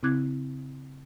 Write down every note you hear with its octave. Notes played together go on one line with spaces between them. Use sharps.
C#3 C4 E4 D6 F#6 G#6